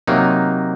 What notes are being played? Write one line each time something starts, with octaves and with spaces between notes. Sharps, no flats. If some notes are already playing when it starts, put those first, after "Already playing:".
C3 F#3 A#3 D#4